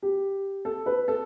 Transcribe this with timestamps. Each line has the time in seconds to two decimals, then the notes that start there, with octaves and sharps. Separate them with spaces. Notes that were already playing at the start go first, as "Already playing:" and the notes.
0.03 G4
0.65 A4
0.86 B4
1.08 A4